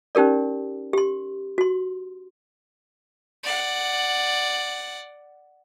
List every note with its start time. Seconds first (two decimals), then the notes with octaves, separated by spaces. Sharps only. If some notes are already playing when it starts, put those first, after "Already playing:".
0.15 C#4 D#4 G4 A#4 D5
0.93 G4 C6
1.58 F#4 C6
3.43 D5 F#5